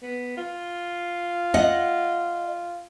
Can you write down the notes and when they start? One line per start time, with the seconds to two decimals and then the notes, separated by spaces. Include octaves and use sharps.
0.02 B3
0.37 F4
1.54 D#5 F#5